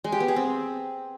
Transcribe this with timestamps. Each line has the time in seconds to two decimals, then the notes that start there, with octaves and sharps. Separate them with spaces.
0.04 G#3
0.12 G4
0.20 B3
0.28 G#4
0.36 C4